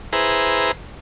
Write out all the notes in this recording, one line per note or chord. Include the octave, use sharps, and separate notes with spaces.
E4 G#4 B4 C5 A#5